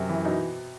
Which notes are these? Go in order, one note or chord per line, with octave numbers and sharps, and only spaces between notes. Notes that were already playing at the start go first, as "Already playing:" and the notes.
Already playing: F#2 C3
E3
B2 D#4